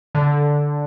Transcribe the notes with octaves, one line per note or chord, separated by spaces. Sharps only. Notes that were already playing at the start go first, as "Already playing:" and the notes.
D3